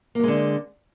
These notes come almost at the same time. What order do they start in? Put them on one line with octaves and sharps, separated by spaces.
A#3 F#3 G#3 D3